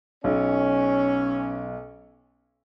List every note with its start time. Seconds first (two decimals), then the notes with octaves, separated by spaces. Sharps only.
0.24 B1 C#4